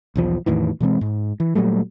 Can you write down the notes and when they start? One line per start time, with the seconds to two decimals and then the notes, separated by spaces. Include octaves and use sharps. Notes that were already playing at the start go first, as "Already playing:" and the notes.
0.16 B1 E2 F3
0.46 E2 A2 D#3 E3
0.80 B2 E3 G#3 C4
1.01 G#2
1.40 E3
1.55 A#2 F#3 G3 A3